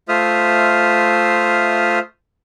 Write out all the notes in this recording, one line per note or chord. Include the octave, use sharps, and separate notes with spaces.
A3 F4 C5 E5 D#6 F6